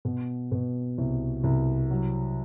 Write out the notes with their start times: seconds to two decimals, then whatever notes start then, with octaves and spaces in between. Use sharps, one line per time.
0.05 B2
0.52 B2
0.98 C2
1.44 C2
1.91 F#3